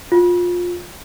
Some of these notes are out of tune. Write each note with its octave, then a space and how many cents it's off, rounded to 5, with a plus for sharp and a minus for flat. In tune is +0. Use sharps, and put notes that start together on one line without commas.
F4 +20